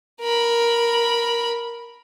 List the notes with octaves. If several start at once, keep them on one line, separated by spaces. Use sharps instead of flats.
A#4 B5